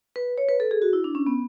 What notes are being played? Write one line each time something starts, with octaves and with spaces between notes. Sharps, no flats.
B4
C#5
B4
A4
G#4
F#4
E4
D4
C#4
B3